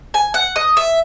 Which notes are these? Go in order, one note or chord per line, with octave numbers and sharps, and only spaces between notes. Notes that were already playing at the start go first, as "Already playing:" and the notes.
G#5
F#5
D#5
E5